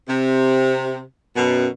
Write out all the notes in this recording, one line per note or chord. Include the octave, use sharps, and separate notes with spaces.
C3
F#2 B2